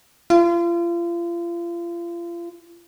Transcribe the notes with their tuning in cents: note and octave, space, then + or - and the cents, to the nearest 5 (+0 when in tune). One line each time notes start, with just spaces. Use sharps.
F4 -35